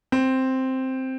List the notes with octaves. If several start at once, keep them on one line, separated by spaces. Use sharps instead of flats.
C4